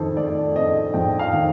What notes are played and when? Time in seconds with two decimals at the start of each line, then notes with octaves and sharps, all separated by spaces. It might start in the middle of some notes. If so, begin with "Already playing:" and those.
Already playing: F2 D#3 A4 C5
0.17 A3 D5
0.55 C4 D#5
0.94 F2 G5
1.19 F5
1.33 D#3